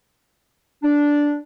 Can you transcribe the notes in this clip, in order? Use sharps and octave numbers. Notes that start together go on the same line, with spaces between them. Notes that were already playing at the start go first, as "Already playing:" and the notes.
D4